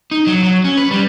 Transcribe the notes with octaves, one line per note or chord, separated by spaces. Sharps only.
D#4
F#3
F#3
C#4
B4
G3